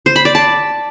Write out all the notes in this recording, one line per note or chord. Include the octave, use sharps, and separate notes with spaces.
C5
B5
D5
A5